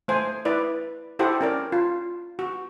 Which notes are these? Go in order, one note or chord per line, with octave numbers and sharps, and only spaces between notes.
A3 C5 G#5
E4 B4 D5
E4 G4 A4 C5 F#5
C#4 A#4 D5
F4
F#4